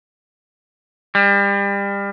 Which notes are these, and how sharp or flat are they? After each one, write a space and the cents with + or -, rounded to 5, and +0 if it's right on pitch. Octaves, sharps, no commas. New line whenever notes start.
G3 +30